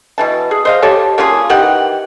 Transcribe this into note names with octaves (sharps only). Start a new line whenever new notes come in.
B2 E3 A5
G#4
C5 D#5 F5
G4 A4 C#5 A5
A#3 C#4 F4 G#4
D#3 E3 G4 F#5